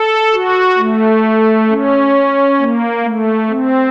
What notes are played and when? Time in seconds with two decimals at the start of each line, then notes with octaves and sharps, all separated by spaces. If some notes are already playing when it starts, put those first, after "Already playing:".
Already playing: A4
0.33 F#4
0.78 A3
1.69 C#4
2.59 A#3
3.04 A3
3.49 C4